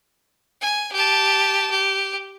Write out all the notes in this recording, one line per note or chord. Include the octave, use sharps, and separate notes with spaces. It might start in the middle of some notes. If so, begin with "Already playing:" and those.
G#5
G4 A5
G4